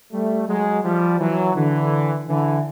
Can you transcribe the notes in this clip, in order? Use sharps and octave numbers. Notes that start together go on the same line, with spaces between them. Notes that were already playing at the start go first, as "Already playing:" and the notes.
G3 A3
F#3 G#3
F3 G3
E3 F#3
D3 E3
D3 E3